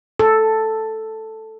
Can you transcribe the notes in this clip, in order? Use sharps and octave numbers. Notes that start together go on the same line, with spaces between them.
A4